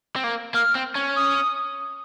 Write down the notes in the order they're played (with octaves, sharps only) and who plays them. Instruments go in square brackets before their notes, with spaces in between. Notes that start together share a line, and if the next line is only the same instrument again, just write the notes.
[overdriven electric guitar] C4
A#3
[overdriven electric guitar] A#3 [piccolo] F6
[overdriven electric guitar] C4
C#4
[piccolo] D#6